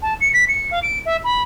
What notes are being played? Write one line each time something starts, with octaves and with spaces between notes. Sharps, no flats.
A5
C#7
B6
C#7
F5
D7
E5
B5